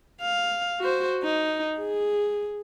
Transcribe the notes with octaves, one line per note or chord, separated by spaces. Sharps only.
F5
F#4 C5
D#4
G#4